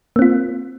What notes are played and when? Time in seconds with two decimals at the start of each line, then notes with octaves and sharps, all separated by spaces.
0.16 A#3
0.19 C4
0.22 F4